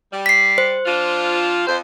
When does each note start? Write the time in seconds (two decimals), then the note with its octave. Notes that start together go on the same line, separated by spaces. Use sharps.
0.12 G3
0.26 B6 C7
0.58 C5
0.86 F3 D4 F4
1.67 F2 C5